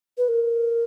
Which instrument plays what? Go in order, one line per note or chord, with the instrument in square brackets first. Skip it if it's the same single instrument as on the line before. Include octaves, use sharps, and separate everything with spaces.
[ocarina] B4
A#4